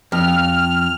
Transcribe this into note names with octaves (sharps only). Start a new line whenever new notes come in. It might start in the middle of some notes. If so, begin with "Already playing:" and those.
F2 F6